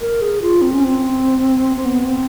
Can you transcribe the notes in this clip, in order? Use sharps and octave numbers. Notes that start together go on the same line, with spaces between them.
A#4
G#4
F4
C4
C#4
C4
C4
B3
C4